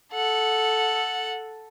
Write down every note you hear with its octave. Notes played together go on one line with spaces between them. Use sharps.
A4 F#5